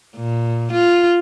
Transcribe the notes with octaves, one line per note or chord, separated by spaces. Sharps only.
A#2
F4